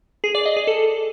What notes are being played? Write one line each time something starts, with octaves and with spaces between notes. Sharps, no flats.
G#4
D5
D#5
G#4
A4